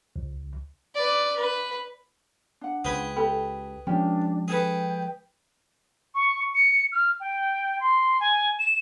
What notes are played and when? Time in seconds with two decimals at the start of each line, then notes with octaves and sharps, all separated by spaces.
0.16 C#2
0.95 B4 D5
1.36 B4
2.61 D4 F#5
2.84 C#2 G#4 B4 G5
3.16 G4 A4 B5
3.87 F3 G#3 C#4 D4 G4
4.48 G#4 A4 B4 G5
6.15 C#6
6.54 C#7
6.92 F6
7.20 G5
7.80 C6
8.20 G#5
8.59 E7